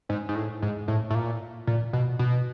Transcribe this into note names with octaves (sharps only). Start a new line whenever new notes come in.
G#2
G#2
A2
G#2
A2
A2
A#2
A#2
B2
B2